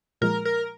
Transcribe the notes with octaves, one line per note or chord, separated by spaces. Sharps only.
A#2 F3 G#3 A#4
A#4